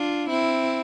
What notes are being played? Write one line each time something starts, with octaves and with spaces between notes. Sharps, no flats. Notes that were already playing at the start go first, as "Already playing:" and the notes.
Already playing: D4 F4
C4 E4